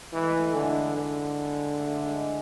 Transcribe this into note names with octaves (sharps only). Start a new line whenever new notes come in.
E3 G#3
A3
G#3
A3
G#3
A3
D3 G#3
A3
G#3
D3 E4
A3
G#3